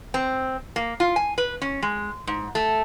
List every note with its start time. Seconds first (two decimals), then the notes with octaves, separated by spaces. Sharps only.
0.14 C4
0.76 A#3
1.00 F4
1.16 G#5
1.38 B4
1.62 C#4
1.82 G#3
2.27 G#2
2.55 A3